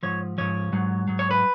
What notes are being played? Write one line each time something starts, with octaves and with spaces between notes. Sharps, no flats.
G#2 F3 C#5
G#2 F3 C#5
G#2 F#3
G#2 F#3
C#5
B4